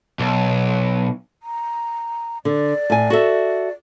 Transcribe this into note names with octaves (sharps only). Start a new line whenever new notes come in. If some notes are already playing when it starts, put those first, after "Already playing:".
B1
A#5
D3 D5
A2 G#5
F#4 A4 E5